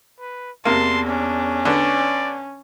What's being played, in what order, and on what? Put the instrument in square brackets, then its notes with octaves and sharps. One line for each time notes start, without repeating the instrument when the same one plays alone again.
[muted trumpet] B4
[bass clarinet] E2 [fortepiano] C3 A#3 [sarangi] A5 [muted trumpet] C6
[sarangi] C#4 [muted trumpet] D4
[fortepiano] D3 B3 [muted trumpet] D5